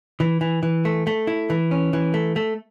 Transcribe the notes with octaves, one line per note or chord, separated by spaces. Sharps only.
E3
E3
E3
A3
A3
E4
E3
C#4
E3
A3
A3